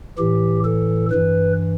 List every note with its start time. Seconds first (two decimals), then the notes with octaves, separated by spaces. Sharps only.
0.18 A2 E3 G4
0.64 A4
1.11 G2 E3 B4